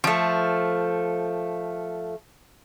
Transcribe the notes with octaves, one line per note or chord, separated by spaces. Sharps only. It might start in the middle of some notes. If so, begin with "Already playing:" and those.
F3 A3